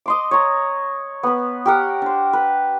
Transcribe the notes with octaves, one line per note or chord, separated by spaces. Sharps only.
D#5 C6 D6
C#5 A#5
B3 B4
G4 A#4 F#5
D4 C5
B4